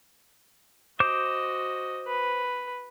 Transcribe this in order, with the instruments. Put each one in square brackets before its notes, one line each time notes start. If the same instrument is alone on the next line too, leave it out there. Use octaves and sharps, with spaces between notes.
[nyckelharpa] F#4 D#5 [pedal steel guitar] C5 D6 G6
[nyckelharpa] B4